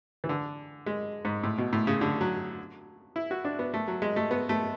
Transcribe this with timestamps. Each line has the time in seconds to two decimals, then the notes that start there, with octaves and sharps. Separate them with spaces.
0.24 E3
0.29 D3
0.86 G#3
1.25 G#2
1.43 A2
1.58 B2
1.73 A2
1.87 C#3
2.01 D3
2.21 F#3
3.16 E4
3.31 F#4
3.45 D4
3.59 B3
3.74 A3
3.88 F#3
4.02 G#3
4.16 A3
4.31 B3
4.49 A3